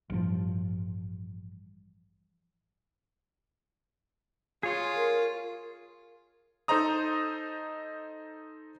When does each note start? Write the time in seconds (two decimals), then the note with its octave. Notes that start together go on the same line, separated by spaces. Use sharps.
0.10 A1 G2 F3
4.63 F4 G#4 C#5 C6
4.96 A#4
6.68 D#4 A4 C5 D#5 A#5 D#6